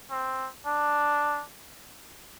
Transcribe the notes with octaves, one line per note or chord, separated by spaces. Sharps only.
C4
D4